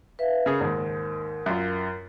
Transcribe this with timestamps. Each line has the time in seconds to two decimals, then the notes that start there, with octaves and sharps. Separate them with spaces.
0.19 B4 E5 F5
0.46 C#3 G#4 A#4
0.61 D#2 G#2
1.46 F#2 F4